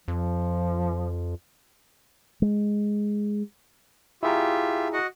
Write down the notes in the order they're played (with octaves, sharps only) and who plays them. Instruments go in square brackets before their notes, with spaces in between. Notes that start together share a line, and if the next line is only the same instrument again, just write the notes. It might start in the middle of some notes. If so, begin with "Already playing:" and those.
[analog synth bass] F2 [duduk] F3
[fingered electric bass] G#3
[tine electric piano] E4 G#4 A#5 [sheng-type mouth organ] F4 G4 E5
[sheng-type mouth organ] F#4 D#5 F#5